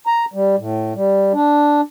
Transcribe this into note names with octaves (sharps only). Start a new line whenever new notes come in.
A#5
G3
A2
G3
D4